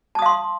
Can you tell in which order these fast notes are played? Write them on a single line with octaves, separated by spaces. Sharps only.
A5 D#6 F5 C6